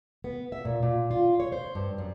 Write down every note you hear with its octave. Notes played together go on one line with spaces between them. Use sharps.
B3
E5
A#2
A#2
F4
C#5
C5
G2
F#2